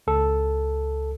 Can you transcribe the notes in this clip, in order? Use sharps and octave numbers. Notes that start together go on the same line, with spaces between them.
C#2 A4